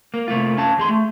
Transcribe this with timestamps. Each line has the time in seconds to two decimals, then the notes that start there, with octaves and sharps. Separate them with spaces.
0.14 A#3
0.28 C3 A3 A#3 F4
0.58 C#4 F5 A5
0.78 E2 G#4 C6
0.89 A3